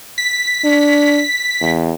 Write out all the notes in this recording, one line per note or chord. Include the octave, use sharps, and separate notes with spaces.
B6
D4
E2